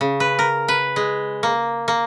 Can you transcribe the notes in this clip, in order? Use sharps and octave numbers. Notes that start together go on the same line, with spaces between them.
C#3
B4
A#4
B4
G#3
A#3
A#3